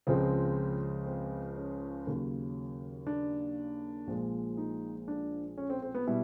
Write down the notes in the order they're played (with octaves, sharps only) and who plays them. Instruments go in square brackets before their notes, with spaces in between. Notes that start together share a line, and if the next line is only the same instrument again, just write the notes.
[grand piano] C#2 C#3 F3 G#3 C4
C4
C#4
D#2 C#3 F#3
D4
A#1 A#2 F3 G#3
D#4
D4
C#4
C4
C4
B3
B2 G3 E4